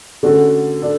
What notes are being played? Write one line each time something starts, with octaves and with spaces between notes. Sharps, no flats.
D3 A3 C#4 F#4 A4
D4 A4